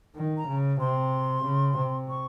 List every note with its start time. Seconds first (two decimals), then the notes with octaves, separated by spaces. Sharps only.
0.16 D#3
0.37 A#5
0.48 C#3
0.80 C3 C6
1.45 C#3
1.78 C3
2.09 C#6